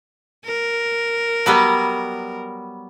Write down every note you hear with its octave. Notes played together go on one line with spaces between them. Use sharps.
A#4
F#3 G3 B3